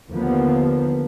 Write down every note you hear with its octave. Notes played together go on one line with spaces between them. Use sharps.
D#2 D3 F3 A#3 B3